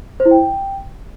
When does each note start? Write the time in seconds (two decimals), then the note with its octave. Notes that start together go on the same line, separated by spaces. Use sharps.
0.20 C5
0.25 E4
0.31 G5